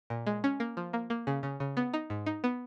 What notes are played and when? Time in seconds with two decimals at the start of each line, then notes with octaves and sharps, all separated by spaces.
0.10 A#2
0.27 G#3
0.44 C#4
0.60 A#3
0.77 F3
0.93 A#3
1.10 A#3
1.27 C#3
1.43 C#3
1.60 C#3
1.77 B3
1.94 D#4
2.10 G#2
2.26 D#4
2.44 B3